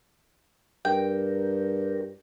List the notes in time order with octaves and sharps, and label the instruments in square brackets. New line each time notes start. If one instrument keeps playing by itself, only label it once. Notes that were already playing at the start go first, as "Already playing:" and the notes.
[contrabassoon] G2 [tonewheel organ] G4 A#4 [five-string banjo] G5